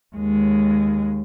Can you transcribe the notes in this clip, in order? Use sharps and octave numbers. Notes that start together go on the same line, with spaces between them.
D#2 G#3